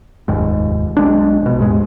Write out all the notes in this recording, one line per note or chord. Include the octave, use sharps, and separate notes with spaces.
F1 D#2 G#2
B1 G#3 D4
A#1 B2
D#2 G#2 G#3